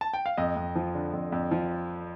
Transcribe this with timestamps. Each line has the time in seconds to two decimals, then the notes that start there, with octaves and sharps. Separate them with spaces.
0.01 A5
0.13 G5
0.26 F5
0.37 F2 D#5
0.56 F2
0.75 F3
0.94 D3
1.13 F2
1.32 F2
1.51 F3